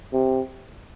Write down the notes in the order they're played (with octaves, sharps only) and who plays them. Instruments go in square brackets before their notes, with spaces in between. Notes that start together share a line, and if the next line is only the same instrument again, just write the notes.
[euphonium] C3